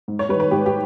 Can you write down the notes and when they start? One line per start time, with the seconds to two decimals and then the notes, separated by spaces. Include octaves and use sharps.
0.08 G#2
0.19 C#5
0.29 G3 B4
0.34 D#3
0.40 B4
0.51 G#2 G4
0.66 G4